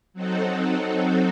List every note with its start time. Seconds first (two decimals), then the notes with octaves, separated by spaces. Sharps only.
0.13 F#3 C4 D#4 F#4 A4